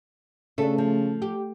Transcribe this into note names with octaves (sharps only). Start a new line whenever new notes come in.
C#3 A3 D4 A4
F3
G4